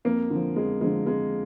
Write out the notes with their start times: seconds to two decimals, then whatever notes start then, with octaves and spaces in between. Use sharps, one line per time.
0.05 F2 A#3
0.30 D3 F3
0.56 F2 G#3
0.81 D3 F3 G#3
1.06 F2 G#3